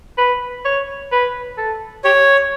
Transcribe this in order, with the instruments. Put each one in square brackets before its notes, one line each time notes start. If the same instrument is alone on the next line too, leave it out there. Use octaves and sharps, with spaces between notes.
[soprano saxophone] B4
C#5
B4
A4
[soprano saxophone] G4 [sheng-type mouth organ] C#5